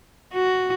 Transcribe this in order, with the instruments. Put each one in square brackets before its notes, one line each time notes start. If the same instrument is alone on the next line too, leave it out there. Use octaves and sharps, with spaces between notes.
[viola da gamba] F#4